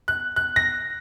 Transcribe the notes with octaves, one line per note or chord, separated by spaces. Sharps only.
F#6
F#6
A#6